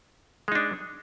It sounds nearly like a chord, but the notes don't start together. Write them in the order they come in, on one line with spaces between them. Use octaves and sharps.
G#3 D#4 D4